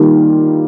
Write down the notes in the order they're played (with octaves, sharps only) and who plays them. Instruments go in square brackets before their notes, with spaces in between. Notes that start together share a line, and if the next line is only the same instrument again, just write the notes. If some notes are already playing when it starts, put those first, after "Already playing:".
Already playing: [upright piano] D#3 G3 A#3 F4 A#4